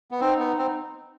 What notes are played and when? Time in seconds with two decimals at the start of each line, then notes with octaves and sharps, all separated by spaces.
0.11 B3
0.21 C4 D#4
0.39 B3
0.58 C4